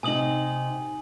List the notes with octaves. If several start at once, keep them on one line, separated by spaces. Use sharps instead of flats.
C3 D#4 G#5 D#6 F#7